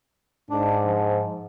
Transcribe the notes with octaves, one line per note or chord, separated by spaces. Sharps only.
G#2 D4
F3